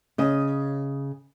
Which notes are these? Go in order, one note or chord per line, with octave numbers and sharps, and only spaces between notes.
C#3 D#5